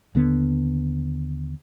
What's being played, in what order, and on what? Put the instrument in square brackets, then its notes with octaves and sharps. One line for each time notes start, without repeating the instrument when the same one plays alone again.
[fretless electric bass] D#2 D3 B3